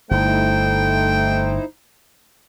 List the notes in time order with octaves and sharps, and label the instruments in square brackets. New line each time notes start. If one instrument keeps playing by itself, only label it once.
[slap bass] G1 [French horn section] A3 [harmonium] D#4 E4 C5 [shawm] G5